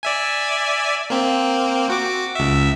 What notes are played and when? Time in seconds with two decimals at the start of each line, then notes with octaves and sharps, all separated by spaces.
0.03 D5 E5 G#5
1.10 A#3 C4
1.90 F#4 D6
2.35 C#2 E5